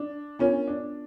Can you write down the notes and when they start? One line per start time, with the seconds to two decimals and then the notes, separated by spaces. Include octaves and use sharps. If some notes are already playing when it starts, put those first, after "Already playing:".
Already playing: D4
0.39 B3 C#4 D4 F4 A#4
0.67 D4